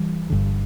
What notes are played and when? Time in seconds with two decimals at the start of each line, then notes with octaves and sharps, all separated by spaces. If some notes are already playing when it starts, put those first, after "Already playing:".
Already playing: E3 G3
0.30 G1 G2 D3